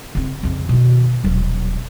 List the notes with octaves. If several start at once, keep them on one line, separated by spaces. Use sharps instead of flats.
C#3 C4
F2 C#3
B2 D#3
D#1 F#3